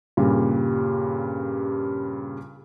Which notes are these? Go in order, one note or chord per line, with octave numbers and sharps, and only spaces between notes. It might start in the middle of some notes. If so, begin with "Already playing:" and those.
G2 A#2 C#3 G3